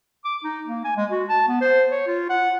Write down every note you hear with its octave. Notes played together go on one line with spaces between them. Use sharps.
D6
D#4
A#3
G#5
G#3
F#4
A5
B3
C5
C#5
F4
F#5